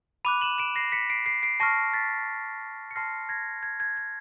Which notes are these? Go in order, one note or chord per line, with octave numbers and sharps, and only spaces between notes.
B5 D6 F#6 D#7 F7
E7 F#7
D7 E7
A#6 C7
B6 C#7
C7 D7
C7 D7
C7 D7
A5 C#6 F6 A#6 C7
A6 B6
C#7
A5 C6 F6 A#6 C7
G#6 A#6
G#6
G#6
G#6